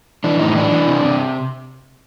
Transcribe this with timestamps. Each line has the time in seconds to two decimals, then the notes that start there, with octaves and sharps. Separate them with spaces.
0.24 E3 D4
0.39 A2 D#4
0.56 E3 D4
0.72 E3
0.88 C3
1.04 C3